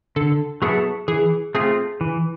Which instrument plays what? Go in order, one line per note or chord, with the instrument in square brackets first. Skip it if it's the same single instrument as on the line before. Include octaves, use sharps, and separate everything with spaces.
[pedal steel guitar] D3 [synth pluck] A4
[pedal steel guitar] F#3 B3 E4 A4 [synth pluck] G#4
[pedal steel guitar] E3 [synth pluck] G#4
[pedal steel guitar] A3 C4 F4 [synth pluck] G#4
[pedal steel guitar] E3